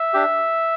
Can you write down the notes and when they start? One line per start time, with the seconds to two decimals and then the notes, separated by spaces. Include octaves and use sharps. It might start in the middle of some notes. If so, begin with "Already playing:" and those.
Already playing: E5
0.13 D4 G4